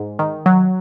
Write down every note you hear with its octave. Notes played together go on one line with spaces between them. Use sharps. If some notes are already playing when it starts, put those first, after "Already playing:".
Already playing: G#2
D#3
F#3